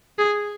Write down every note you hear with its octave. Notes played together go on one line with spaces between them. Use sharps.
G#4